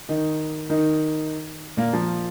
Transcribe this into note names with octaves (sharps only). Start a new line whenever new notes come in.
D#3 D#4
D#3 D#4
A#2 A#3
F3